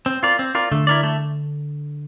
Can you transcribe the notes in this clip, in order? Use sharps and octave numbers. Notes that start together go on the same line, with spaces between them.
C4
F4 A#4 D5
C4
F4 A#4 D5
D3 A3
E4 A#4 D5
A3